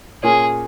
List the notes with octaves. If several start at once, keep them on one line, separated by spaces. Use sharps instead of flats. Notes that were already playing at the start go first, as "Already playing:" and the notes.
A#2 A#3 C#4 G#4 A#4 C#5